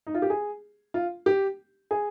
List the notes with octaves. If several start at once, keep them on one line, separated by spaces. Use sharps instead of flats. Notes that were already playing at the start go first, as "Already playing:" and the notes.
D#4
F4
G4
G#4
F4
G4
G#4